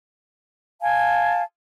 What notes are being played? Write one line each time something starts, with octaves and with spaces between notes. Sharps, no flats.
F5 G#5 A5